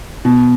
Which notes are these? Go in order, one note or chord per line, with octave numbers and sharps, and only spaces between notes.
B2